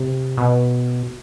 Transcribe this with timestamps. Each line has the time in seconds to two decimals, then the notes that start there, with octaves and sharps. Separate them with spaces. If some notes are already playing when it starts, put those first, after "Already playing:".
Already playing: C3
0.37 B2